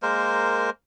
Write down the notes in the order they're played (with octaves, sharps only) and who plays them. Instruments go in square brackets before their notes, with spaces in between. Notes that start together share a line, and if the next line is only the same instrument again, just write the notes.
[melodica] G#3 A#3 A#4 C5